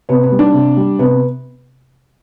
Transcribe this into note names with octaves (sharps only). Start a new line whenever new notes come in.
C3 B3
B3
G3
D4
C3
G3
C3 B3